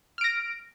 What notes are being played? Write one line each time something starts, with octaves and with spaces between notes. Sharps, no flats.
F6 A#6 D7